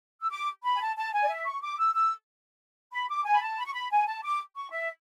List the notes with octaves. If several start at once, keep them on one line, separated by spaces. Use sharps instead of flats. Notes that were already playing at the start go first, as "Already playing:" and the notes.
E6
D6
B5
G#5
A5
A5
G#5
D5
E5
C#6
D6
E6
E6
B5
D6
G#5
B5
A5
B5
C#6
B5
G#5
A5
D6
C#6
E5